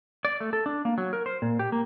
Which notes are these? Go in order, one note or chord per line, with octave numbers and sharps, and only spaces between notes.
D5
A3
A4
D4
A#3
F#3
A#4
C5
A#2
G4
A#3